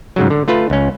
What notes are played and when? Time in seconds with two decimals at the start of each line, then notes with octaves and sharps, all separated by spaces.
0.16 G#2 C#3 F#3
0.30 D3
0.48 A3 F4 B4
0.70 C#2 C#4